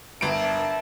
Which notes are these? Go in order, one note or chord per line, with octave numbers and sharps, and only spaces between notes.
G1 D4 A#4 E5 A5 D7